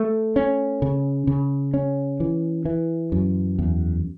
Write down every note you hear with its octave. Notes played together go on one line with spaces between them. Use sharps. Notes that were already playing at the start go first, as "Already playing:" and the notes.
Already playing: A3
C#4
C#3
C#3
C#4
E3
E3
F#2
E2